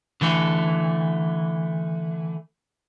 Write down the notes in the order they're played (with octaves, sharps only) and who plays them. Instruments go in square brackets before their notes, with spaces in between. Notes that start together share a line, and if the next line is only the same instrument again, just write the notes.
[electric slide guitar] D3 E3 A3